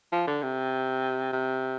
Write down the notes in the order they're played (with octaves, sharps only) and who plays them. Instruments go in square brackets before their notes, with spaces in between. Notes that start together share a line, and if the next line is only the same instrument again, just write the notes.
[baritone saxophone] F3
D3
C3
C3